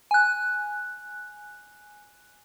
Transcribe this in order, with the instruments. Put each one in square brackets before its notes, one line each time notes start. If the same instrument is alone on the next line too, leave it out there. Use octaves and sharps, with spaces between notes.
[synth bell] G#5 F#6